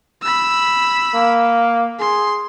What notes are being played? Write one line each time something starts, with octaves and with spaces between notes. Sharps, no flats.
B5 E6
A#3
G#4 C6